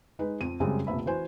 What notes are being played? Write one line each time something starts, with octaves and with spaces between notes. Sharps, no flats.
G#3 D#4 B4
F2 D#7
F#2 C#3 G3 G#3 C4
F1 A#1 E5 B5
E3 F#4 C5 G#5